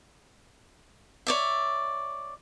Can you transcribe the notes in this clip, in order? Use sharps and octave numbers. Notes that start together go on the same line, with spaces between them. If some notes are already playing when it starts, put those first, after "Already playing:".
C#5 D5 E5